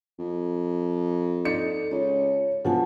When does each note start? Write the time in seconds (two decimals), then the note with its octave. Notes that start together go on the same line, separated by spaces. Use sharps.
0.19 F2
1.45 D#4 A4 D5 C#7
1.91 C#2 C#5
2.65 E1 B2 F3 F#5 G#5 A5